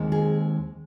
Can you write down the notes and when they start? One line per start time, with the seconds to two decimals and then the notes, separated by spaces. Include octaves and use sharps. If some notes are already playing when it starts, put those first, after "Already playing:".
Already playing: D#2 D#3 G#3 C4 D#4
0.12 G#4